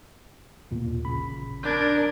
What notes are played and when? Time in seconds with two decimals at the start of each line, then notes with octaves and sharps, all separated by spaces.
0.71 D#2 A#2
1.05 A1 C#3 B5
1.63 D4 A#4 G6 G#6